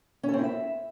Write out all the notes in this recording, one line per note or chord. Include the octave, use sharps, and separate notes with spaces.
C#4
A4
C4
E4
E5